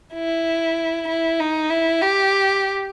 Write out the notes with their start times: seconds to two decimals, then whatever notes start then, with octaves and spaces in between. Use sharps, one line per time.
0.14 E4
1.08 E4
1.40 D#4
1.70 E4
2.02 G4